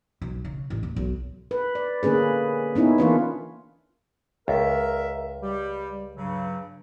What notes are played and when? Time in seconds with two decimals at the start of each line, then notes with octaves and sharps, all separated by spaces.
0.22 B1
0.45 C#3
0.70 A1
0.83 D#1
0.96 B1
1.51 B4
1.75 D5
2.03 D3 A#3 C#4 G#4 B4
2.75 B3 C#4 D#4 E4
2.98 E3 A#3 D4 F4 B4 C#5
4.48 C#2 A#4 E5
5.43 G3 G4
6.17 G2 C#3 F#3